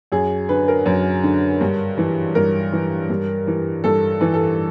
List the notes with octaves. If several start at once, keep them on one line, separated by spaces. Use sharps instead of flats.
F#2 G#4
D3 B4
A#4
F#2
D3
G2
E3
G2 A#4
E3
G2
E3
G2 A4
E3
A4